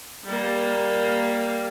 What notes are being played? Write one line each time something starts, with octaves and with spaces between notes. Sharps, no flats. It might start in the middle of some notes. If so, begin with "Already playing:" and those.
G3 A#3